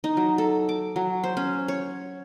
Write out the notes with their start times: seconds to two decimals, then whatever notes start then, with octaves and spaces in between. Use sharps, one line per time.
0.04 D#4
0.17 F#3
0.38 A4
0.69 D6
0.96 F#3
1.24 C5
1.37 C#4
1.68 C#5